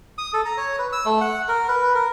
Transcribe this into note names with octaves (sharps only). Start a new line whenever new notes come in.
D#6
A4
A#5
C#5
B4
E6
A3
F#5
A#4
B4
A#4